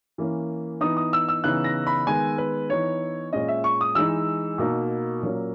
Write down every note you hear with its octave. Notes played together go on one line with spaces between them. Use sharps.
E3 A#3 C#4
E3 B3 D#4 D#6
D#6
E6
E6
C#3 E3 B3 D#4 F#6
A#6
B5
D#3 G#3 B3 G#5
B4
E3 B3 D#4 C#5
A#2 G#3 C#4 D#5
E5
C#6
D#6
E3 G#3 D#4 E6
B2 A#3 D#4
A#2 F#3 A#3 C#4